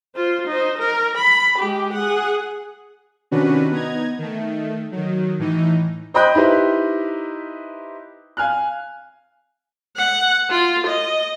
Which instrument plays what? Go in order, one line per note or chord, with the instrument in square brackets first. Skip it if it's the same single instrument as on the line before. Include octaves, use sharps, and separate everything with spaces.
[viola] F4 C5
D#4 C5
A#4
B5
G#3 G4
G#4 F#5
[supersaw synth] C3 D#3 C#4 D4 F#4 B4
B3 D#4 A#5 G#6
D#3 A3
D#3 F#3
A2 E3 D#4
[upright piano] C5 D#5 G5 B5 F#6 G6
D#4 E4 G4 B4 C5
F5 G#5 F6 F#6
[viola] F#5
F4
D#5